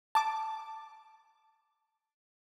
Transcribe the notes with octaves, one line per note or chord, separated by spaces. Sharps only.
A5 D6